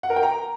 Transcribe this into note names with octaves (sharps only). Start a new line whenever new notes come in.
F#5
A#4
G5
A#5